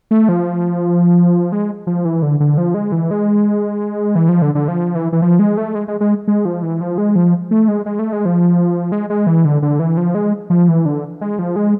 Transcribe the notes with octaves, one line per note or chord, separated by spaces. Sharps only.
A3
F3
G#3
F3
E3
D3
D3
F3
G#3
E3
G#3
E3
F3
D3
D3
F3
E3
E3
F3
G#3
A3
G#3
G#3
G#3
G#3
F3
E3
F3
G#3
F3
A3
G#3
G#3
A3
G#3
F3
G#3
G#3
E3
D3
D3
E3
F3
G#3
F3
E3
D3
G#3
F3
G#3